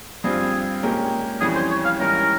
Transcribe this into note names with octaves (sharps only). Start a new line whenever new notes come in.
G2 G3 C4 F4 G#4
A#2 G#3 C#4 G4 A#4
F2 E3 G3 C#4 G#4
C5
C#5
F5
G#2 E3 G3 C#4 A#4